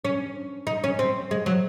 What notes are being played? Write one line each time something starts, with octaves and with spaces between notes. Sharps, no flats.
C#4
D#4
C#4
C4
G#3
F#3